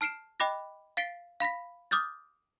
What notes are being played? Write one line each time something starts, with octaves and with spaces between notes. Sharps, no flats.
A5 F6 C7 D7 E7
D#5 G5 B5 D6 F#6 A#6
F5 A6 B6 C7 D7 G7
F5 B5 A#6 B6
D6 D#6 F6 G6 A6